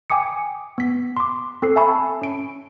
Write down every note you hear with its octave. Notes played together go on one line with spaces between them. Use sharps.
G5 G#5 D6 D#6 C#7
B3 B6
C6 D6
C4 A4 E6 C7
E5 G#5 A5 B5 C#6 E6
C#4 D7